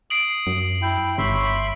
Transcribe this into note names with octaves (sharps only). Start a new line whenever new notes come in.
D#6 C7 D7 F#7
F#2
E4 G5
G1 C#5 E5 B5 C6